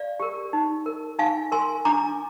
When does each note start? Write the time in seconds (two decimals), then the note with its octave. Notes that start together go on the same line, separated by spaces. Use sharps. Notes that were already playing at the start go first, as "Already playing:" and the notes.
Already playing: D5 F5
0.20 G4 A#4
0.53 D#4
0.86 A#4
1.19 D#4 F5 G#5
1.52 A#4 G#5 C6
1.85 D4 A#5 D6